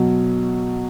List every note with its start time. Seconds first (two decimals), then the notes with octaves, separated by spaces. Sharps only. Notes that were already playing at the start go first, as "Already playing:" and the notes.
Already playing: B2 F#3